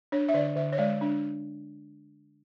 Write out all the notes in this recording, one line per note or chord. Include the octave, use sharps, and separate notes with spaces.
D4 C#5
E5
D3 D5
D3 E5
C#5
G#3 D5
D4